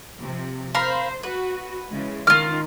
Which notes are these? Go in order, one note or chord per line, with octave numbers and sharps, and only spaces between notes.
C3 F3
A#4 C5 F5 B5
F#4 B4
C#3 E3 G#3
D#3 F4 F6